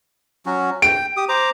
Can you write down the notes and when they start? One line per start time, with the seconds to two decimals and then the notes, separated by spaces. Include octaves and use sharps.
0.46 F#3 C#4 F#4
0.82 G5 D7
1.17 G4 D#6
1.29 C5 A#5 D6